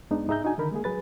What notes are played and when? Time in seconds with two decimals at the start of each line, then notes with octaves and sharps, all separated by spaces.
0.11 F#2 G#3 B3 D4 D#4
0.28 G#2 D#4 G#4 E5 A#5 G6
0.44 D4 D#4 F#4 G#5
0.58 D3 D#3 A#4 B5
0.72 G#3 A#3 G#4
0.84 F#3 G#4 B4 A6